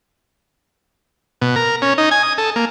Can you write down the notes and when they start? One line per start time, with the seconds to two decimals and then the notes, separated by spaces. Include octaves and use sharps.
1.41 B2
1.56 A#4
1.82 C#4
1.98 D#4
2.11 G#5
2.23 D#6
2.38 A4
2.56 A#3